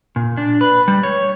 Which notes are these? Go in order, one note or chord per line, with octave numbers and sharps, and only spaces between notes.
A#2
D4
B4
G3
C#5